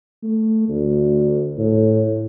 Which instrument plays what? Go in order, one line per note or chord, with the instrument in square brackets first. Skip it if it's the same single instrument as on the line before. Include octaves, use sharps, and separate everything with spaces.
[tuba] A3
D2
A2